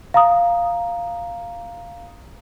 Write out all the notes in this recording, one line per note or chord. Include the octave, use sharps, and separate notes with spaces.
F5 A#5 D#6